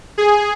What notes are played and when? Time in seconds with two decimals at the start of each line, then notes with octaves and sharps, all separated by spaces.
0.18 G#4